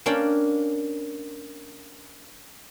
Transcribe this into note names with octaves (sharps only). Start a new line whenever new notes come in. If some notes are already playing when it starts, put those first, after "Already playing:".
A#3 C#4 D4 D5 F5 G5